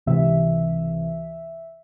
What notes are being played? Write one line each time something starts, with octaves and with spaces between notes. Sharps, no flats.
C#2 C3 E3 E5